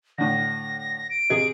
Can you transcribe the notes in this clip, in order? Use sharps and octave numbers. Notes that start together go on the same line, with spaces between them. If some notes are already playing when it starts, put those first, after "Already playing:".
A2 D3 A#6
D7
C3 G#4 D#5